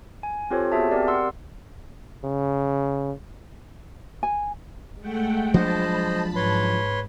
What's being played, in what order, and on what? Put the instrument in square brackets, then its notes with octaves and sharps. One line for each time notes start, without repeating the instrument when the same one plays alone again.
[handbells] G#5
C4 F4 G4 A4 C5 C#5
B3 F#4 G#4 E5 A5
C4 G4 A#4 D5
F#5 C6 E6
[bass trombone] C#3
[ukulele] G#5
[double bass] G#3 [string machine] A3 F#5 G5
[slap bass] F3 F#3 D4 [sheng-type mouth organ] C5 D#5 [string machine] A5 B5
[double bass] G#2 [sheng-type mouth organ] B4 C#5 C6